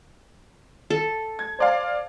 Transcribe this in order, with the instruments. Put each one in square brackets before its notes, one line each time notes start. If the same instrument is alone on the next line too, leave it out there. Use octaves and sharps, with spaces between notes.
[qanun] A4
[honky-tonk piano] G#6
C5 D5 F5